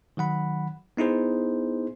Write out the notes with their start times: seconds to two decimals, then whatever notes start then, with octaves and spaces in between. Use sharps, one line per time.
0.17 D#3 F#3 F#5 B5
0.97 B3 D#4 E4 G#4 C5